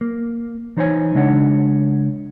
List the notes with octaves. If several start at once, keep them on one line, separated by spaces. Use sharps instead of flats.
A#3
E3 D#4 C5 C#5 G#5
C#3 G#3 D4 C#5 F#5